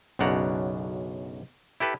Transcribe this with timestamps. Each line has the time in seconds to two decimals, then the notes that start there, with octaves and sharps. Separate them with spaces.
0.19 B1 F#2 C#3 D4 F#5 A#5
1.80 E4 G4 A4 B4